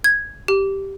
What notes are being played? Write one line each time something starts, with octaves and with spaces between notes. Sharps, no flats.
G#6
G4